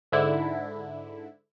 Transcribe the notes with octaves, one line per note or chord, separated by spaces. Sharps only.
G#2 D3 E4